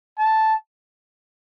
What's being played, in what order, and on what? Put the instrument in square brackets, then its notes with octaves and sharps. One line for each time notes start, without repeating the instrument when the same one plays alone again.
[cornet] A5